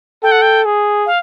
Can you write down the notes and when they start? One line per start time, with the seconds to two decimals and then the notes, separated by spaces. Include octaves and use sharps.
0.23 A4 G5
0.32 F#5
0.42 G5
0.65 G#4
1.06 F5